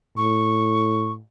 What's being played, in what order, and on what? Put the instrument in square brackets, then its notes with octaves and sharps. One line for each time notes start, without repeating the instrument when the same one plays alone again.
[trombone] A2 [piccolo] C#6